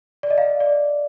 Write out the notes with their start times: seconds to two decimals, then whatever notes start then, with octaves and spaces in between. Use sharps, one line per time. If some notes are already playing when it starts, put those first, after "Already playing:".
0.23 D5
0.30 D#5
0.38 F5
0.60 D5